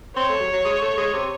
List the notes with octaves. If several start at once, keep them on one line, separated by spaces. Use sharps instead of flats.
C4 C#5
A3
F#3
F#3
G#3
A3
G#3
C3